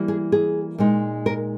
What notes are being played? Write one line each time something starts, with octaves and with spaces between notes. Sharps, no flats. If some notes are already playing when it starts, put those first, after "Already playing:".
Already playing: E3 G3 A#3
G#4
G#4
A#2 G#3 D#4
A#4